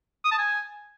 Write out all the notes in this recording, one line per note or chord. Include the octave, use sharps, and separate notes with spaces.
D#6
A5
G#5